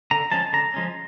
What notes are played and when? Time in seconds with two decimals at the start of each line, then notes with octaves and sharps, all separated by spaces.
0.11 D3 A#5
0.31 F3 G#3 C#4 A5
0.53 D3 A#5
0.74 F3 G#3 C#4